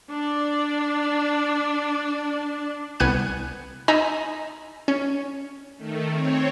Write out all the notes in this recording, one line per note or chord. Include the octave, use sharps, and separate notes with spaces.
D4 D5
C2 B3 G#5 F#6 C#7 D#7
D#4 D#5 G#5 A#5 B5 E6
C#4
D#3 A3
C4 C#5